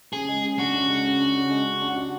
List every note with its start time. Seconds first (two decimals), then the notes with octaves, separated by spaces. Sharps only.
0.13 C#3 G#4
0.29 G#3
0.43 C#3
0.59 D4 F#4
0.74 C#3
0.89 G#3
1.05 C#3
1.20 D4
1.36 C#3
1.50 G#3
1.66 C#3
1.81 D4
1.97 F#4